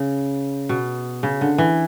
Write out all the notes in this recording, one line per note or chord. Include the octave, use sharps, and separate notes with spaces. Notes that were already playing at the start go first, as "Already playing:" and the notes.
Already playing: C#3
B2
C#3
D3
E3